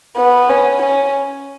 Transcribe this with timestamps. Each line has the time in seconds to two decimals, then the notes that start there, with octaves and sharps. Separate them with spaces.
0.17 B3
0.50 C#4
0.82 C#4